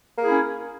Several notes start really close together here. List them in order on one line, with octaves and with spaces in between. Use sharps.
A#3 G#4 E4 C#4